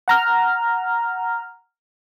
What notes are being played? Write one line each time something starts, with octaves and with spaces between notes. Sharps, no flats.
F#5 A#5 F6